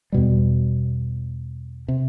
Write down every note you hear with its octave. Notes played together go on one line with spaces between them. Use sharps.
E2 B2 G3
C3